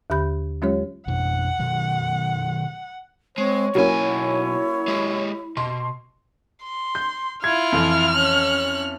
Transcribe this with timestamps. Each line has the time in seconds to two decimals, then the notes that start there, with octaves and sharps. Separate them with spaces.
0.10 D#2 D3 G4 B5 G6
0.62 F#3 G#3 C#4 F4 G4 C#5
1.07 F2 B2 F#5
1.59 B2 D#3 F#3
3.38 G#3 C4 C#5
3.75 B1 F#3 A#3 C#4 E4 G#5
4.88 G#3 G4
5.57 B2 C6
6.63 C6
6.95 G6
7.44 E4 F4 F6 G#6
7.72 F2 E3
8.14 C#4 F#6